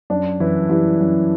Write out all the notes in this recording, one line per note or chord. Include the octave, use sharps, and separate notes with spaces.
F#2 D4
F#2 E3 E4
E3 G3 E4
F#2